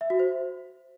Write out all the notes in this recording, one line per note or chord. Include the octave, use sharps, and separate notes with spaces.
E5
F#4
C5